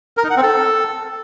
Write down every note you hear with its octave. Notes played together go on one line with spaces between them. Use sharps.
A#4
D#4
F#5
C4
A4